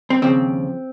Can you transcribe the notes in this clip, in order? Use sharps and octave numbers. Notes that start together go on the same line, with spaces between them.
C4
D#2 C#3 F3 C4